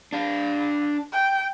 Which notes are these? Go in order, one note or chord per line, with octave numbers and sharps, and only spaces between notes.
D4 F5
G5